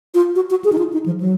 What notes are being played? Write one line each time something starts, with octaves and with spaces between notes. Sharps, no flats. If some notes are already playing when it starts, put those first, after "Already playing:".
F4
F#4
F#4
G#4
D#4
F4
D#4
F3
F#3